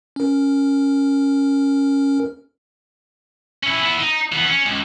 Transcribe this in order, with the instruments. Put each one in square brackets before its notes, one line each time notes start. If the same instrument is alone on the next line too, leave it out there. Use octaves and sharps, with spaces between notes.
[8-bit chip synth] C#4 A#4
[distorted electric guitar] C#4 E4
B3 E4
D#4
E3 B3
C#4
C#2